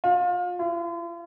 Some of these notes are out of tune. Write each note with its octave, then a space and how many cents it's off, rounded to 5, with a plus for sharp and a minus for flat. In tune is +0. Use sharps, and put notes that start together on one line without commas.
F4 +30
F4 -45